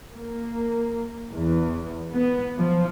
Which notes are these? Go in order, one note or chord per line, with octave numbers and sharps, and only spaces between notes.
A#3
E2
B3
F3